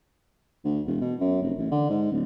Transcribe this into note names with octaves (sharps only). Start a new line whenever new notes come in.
D2
E1
B2
F#2
F1
A1
D3
G#2
D1